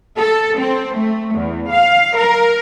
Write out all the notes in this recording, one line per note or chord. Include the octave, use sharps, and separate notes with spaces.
A4
C4
A3
E2
F5
A#4